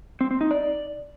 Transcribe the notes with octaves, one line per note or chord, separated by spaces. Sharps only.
C4
C4
D#4
D5